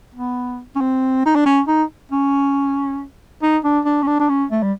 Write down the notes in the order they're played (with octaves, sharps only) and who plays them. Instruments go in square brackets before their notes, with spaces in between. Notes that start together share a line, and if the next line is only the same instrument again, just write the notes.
[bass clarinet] B3
C#4
C4
D#4
D4
C#4
D#4
C#4
D#4
D4
D4
C#4
D4
D4
C#4
A3
G3